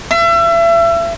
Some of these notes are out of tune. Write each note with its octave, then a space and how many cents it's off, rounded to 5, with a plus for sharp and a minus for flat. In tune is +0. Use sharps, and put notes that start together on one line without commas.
E5 +35